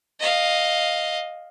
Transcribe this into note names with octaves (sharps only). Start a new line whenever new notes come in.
D#5 F5